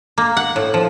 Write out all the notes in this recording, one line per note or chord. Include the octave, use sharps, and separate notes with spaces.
A#3
F#5
A2
F3